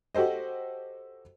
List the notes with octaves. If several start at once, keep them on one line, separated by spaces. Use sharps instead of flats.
F#4 G4 A4 C5 D#5